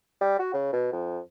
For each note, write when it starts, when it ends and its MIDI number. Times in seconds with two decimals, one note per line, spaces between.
0.21 0.37 55
0.39 0.52 66
0.54 0.70 49
0.73 0.92 47
0.93 1.19 41